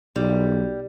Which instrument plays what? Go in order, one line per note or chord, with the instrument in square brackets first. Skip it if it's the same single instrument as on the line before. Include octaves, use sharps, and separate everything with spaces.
[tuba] B1 [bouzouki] G3